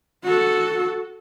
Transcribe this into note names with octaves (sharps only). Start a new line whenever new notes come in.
F#4 A4